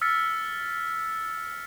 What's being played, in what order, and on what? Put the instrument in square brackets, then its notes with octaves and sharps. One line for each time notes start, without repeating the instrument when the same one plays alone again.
[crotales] E6 F6 A6 B6 C#7